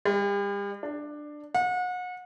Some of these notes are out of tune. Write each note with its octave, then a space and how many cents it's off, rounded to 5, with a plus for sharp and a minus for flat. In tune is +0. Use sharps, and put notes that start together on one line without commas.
G3 +40
D4 +15
F#5 -35